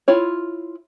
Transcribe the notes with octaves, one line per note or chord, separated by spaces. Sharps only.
E4 F4 C#5